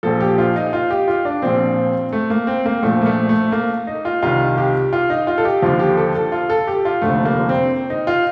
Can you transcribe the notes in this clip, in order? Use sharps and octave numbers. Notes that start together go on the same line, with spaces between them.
A#1 A#2 F3 A4
G4
F4
D#4
F4
G4
F4
D4
A#1 A#2 F3 C4
A3
A#3
C4
A#3
A#1 A#2 F3 A3
A#3
A3
A3
A#3
D#4
F4
C2 C3 D#3 F4
G4
F4
D#4
F4
A4
G4
D#2 D3 F3 F4
G4
A4
A4
F4
A4
G4
F4
F1 D#2 D3 F3 A3
A#3
C4
D#4
F4